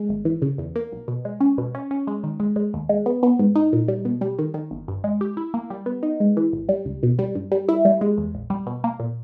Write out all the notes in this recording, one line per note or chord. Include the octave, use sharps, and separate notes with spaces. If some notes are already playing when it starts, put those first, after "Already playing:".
Already playing: G#3
G#1
E3
C#3
E2
A#3
B1
B2
G#3
C#4
B2
C#4
C#4
G#3
D#3
G#3
G#3
D#2
G#3
B3
B3
G#2
D#4
A#2
G3
B2
G3
D#3
D#3
G1
G2
G#3
G4
E4
A#3
G3
B3
D#4
G#3
E3
G#1
G3
C#2
B2
G3
G2
G3
E4
G3
G#3
E2
A#1
G3
B2
A#3
A#2